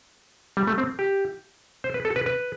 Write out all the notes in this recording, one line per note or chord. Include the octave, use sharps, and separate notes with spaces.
G3
A3
C4
G4
C5
B4
A4
B4
B4